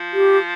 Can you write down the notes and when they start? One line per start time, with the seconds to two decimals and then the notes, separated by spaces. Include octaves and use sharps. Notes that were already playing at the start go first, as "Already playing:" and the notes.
Already playing: F3
0.13 G4